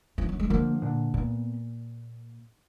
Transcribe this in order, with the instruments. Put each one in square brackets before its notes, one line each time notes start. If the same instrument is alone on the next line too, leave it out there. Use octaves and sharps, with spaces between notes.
[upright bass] F3
F#3
G#3
[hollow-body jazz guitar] D3 F3 [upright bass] A#3
[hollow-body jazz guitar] A#2 D3
[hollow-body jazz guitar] A#2 [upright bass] B3